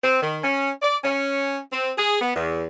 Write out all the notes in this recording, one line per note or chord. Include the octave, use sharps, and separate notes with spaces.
C4
D#3
C#4
D5
C#4
C4
G#4
B3
E2